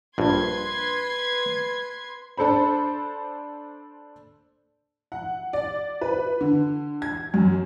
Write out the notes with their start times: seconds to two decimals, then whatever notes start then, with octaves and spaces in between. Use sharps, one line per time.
0.18 A#1 G2 B4 C6 G#6
2.38 D4 A4 C5 B5
5.12 F#5
5.53 D5
6.01 B4
6.41 D3
7.02 G#6
7.34 F#2